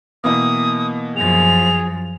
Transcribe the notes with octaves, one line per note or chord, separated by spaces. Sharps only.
B2 E3 A#3 D#6
F#2 F3 G#4 F7